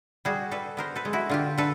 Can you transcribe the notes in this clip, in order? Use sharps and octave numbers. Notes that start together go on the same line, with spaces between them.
G3 F#4 G#4
G3 A4 B4
B3 A#4 C5
A4 B4
G#3
E4 F#4
D3 F4 G4
D3 A4 B4